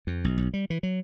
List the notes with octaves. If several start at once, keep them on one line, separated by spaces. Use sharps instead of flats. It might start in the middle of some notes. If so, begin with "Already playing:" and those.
F2
B1
B1
G3
E3
F#3